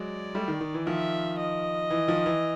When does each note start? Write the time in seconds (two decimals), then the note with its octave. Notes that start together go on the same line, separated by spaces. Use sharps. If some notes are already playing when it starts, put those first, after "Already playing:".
Already playing: F#3 G#3 D5
0.35 G3 A3
0.48 D#3
0.61 D#3
0.74 E3
0.87 D#3 F3 E5
1.39 D#5
1.90 E3
2.08 D#3 F3
2.26 E3